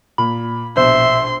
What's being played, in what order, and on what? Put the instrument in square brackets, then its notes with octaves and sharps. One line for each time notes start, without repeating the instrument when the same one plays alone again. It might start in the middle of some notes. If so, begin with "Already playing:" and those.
[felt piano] A#2 [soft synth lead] B5
[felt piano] A#1 B2 [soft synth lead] C5 [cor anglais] E5 [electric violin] C6